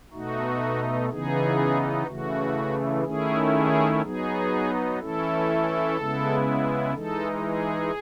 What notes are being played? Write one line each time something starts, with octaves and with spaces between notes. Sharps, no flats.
B2 A3 D#4 F#4
C#3 E3 B3 D#4 G#4
C#3 E3 A3 F#4
D#3 A3 C#4 E4 G#4
G#4
F#3 B3 D#4 G#4
E3 A3 C#4 E4 A4
C#3 G#3 B3 E4
E3 G#3 D#4 A4
G#4